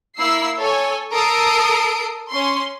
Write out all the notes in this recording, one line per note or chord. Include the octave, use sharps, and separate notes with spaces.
A#3 E4 E6 C7
A4 C#5 G#5
A4 A#4 D#6 C7 D7
C#4 C6